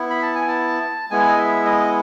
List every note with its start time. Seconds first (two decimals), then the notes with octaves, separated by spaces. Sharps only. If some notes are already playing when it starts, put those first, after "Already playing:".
Already playing: B3 E4
0.10 B5
0.22 A5
0.35 G#5
0.48 A5
1.11 G#3 B3 E4 G#5
1.28 D#5
1.38 E5
1.66 D#5